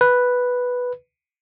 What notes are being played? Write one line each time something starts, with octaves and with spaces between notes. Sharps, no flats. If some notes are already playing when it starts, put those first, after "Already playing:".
B4